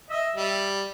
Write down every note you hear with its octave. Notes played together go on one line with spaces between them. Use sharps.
D#5 E5
G3